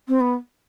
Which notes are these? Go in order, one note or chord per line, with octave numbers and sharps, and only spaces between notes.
C4
B3